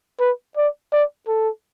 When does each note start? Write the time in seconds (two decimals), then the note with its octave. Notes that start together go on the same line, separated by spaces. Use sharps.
0.20 B4
0.57 D5
0.92 D5
1.27 A4